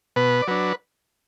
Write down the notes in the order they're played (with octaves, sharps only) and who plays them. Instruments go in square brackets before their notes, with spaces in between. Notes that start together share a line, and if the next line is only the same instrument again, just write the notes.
[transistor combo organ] B2 B4
D5
F#3 D4 B4